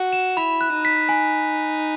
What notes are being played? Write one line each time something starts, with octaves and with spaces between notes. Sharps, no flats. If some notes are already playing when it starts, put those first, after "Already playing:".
Already playing: F#4
E7
E4 B5
F#6
D#4
B6
G#5